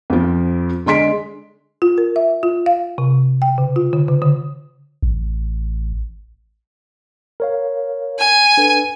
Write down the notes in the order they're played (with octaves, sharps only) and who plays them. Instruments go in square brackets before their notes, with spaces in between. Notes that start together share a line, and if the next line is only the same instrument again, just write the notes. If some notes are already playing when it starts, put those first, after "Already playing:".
[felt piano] F2 F3
D3 G#3 C6 B6 D7
[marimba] F4
A#4
E5
F4
F5
C3
G5
C#3
F4
D3
C#3
D3
[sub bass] A1
[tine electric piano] A#4 C#5 F5
[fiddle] G#5
[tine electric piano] D4 A4 B4